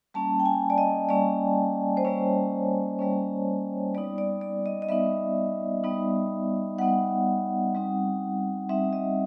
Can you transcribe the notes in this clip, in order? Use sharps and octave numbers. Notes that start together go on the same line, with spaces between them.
G3 A#3 C#4 A5
G5
G#5
D5
D#5
G3 A#3 C#4 D5
C5
G3 A#3 C#4 C#5
G3 A#3 C#4
G3 B3 D#4 D5
D5
D5
D#5
D#5
G3 B3 D#4 E5
G3 B3 D#4
G3 B3 D#4 F#5
G3 C4 D#4
G3 C4 D#4 E5
D#5